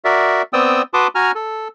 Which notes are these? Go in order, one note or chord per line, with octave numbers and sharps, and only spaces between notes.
F#4 A#4 D5 E5
B3 C4 D5 G5 D#6 E6
F#4 B4 A5 C6 D6 D#6
F#4 G#5 A#5 F6
A4